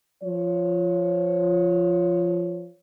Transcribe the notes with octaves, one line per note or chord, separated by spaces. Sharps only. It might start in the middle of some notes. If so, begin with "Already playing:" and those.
F3 C#5